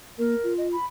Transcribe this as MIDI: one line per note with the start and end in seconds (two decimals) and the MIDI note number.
0.19 0.35 58
0.19 0.54 70
0.43 0.76 65
0.58 0.68 75
0.72 0.85 83